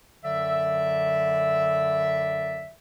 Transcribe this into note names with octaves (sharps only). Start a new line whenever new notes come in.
F#2 D3 F#3 D5 E5